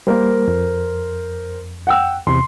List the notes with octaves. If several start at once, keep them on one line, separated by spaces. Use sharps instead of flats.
G3 A#3 A#4 C5
F2
F#5 G5 E6
E2 C3 C6